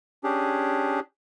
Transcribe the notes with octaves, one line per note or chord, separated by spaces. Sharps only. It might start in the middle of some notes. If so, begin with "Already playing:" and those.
C#4 D4 G4 G#4